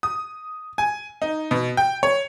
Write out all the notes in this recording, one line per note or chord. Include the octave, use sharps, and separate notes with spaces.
D#6
G#5
D#4
B2
G5
C#5